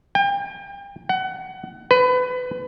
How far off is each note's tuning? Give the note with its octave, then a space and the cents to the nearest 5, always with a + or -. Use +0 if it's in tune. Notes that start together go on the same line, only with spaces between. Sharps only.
G5 +35
F#5 +25
B4 +25